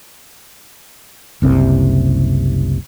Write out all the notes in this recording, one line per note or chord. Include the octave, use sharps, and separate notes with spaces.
F#1 C2 C3